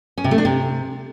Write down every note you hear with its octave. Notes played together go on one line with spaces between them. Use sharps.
C#4
C3
A3
D4
C3